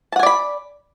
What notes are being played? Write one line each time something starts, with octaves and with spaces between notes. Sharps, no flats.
D5 F#5 G#5 A5 B5